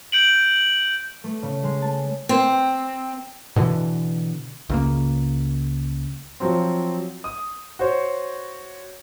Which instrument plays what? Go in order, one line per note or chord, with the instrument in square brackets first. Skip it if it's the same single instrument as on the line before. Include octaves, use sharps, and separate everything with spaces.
[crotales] G6 D7 F#7
[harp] A3
C#3
G#3
A5
[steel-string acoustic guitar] C4
[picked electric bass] B2 D3 E3
C#2 C#3 A#3
[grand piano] F3 F#3 C4
D#6
F#4 C5 C#5